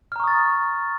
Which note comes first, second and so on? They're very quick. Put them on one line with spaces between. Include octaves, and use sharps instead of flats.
F6 A#5 C#6 D#6 A6